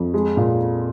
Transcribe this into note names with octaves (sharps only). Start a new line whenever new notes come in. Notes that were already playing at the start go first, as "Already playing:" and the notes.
Already playing: F2
G#3
A#2